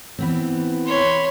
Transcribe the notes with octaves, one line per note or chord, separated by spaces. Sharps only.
E3 B3 C4
C#5 B5 C6